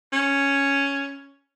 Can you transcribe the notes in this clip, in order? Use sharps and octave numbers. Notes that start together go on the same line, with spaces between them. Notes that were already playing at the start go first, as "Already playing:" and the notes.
C#4